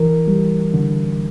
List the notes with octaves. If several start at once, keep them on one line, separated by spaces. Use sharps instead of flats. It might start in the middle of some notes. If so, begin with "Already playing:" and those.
Already playing: E3 A#4
G3
D3